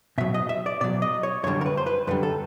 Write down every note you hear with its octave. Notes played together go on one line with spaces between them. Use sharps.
B2 F#3 E5
D#5
E5
D5
B2 F#3 D5
D#5
C#5
F#2 D3 G3 C#5
A#4
B4
C5
B4
F#2 D3 G3 B4
A4